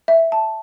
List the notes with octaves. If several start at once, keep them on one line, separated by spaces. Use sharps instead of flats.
E5
A5